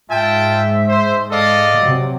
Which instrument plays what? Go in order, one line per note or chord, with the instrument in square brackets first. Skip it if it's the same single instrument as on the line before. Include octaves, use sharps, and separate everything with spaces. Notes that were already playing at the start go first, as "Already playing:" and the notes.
[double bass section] G#2 [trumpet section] F4 G5 A5 [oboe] E5
[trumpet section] C5
[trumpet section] A4 D#5 F5 [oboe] D5
[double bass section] C3 F#3